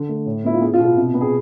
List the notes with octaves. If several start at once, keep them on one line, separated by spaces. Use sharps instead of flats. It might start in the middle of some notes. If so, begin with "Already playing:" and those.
Already playing: D3
A3
A2
B3 E4
F4
B3 G#4
F4
B2
F4
C3
B3
G#4